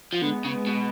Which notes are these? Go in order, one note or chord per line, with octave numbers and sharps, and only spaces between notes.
F3
D3 G#3 B3
C#3
B2